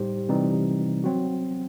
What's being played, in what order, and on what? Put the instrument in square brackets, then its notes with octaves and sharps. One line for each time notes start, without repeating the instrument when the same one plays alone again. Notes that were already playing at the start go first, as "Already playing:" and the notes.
Already playing: [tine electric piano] A2 G3 D#4 G4 C5
C3 E3 G3 C4 D#4
F#3 C4 F#4